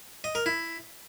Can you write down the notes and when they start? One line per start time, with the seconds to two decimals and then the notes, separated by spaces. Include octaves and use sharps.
0.24 D#5
0.35 A#4
0.46 E4